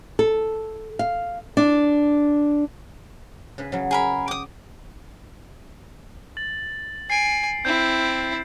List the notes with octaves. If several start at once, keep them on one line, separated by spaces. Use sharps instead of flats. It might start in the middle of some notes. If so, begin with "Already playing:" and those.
A4
F5
D4
C#3 B4
C#3 F#3
G#4 A#4 B5
G5 D6 D#6
A6 F#7
G#5 C7 D7
C4 E4 G6